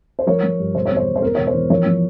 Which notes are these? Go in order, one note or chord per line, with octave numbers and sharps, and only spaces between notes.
C5
F3 A#4 C#5
F3
G2
E1 C5
C#5
E2
C5
E1
C5
E2 A#4
E1 C#5
C5
E3
F3 A#4 C#5
F3